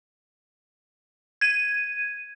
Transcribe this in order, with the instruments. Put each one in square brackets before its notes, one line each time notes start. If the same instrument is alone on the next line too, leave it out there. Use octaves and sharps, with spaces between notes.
[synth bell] G#6 D#7